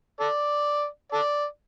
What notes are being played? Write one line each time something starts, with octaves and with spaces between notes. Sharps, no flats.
A4 D5
A4 D5